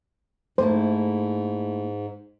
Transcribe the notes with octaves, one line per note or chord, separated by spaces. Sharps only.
G#2 A3 A#3 E4 C5